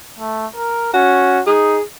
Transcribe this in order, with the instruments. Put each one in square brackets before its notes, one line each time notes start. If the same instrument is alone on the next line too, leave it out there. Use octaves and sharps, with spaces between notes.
[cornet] A3
A#4
[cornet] C#4 [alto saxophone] F#4
[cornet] D#4 [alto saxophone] G#4